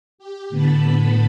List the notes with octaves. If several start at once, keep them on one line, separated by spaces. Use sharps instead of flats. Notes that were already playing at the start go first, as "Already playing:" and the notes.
G4
A2 D3 B3 A5 B5